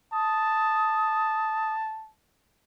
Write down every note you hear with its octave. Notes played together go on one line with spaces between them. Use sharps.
A5 D#6